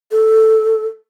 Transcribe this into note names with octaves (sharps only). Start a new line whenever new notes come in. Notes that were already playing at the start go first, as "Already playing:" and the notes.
A4